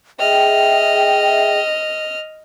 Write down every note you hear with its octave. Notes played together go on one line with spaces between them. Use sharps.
G#4 D#5 E5 G5 F6